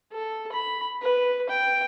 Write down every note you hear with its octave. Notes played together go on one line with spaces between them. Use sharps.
A4
B5
B4
G5